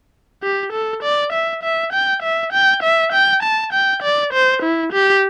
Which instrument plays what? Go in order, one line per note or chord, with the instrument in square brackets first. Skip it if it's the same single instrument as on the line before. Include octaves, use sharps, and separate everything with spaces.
[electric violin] G4
A4
D5
E5
E5
G5
E5
G5
E5
G5
A5
G5
D5
C5
E4
G4